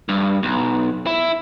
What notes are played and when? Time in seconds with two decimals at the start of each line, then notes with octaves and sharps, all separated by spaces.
0.09 G2
0.43 B1
1.07 E4